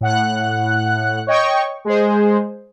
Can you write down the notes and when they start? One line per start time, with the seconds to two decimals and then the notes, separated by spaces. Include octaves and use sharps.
0.01 A2 F#5 F#6
1.27 C#5 D#5 G5 C#6
1.85 G#3 G#4 C5